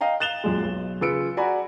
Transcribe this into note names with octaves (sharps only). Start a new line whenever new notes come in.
D#5 F5 G5 A#5
F#6 A6 E7 F7 G7
F#2 A#2 G#3
B1
C#3 F4 B4 E6 C#7 D7
F#4 D5 G#5 A#5 B5